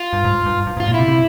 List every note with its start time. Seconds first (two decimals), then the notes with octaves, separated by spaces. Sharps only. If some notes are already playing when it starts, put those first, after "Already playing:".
Already playing: F4
0.13 G2
0.25 G#2
0.46 G2
0.67 G2
0.77 G#2
0.80 F4
0.87 A#2
0.94 C3 E4
1.08 C3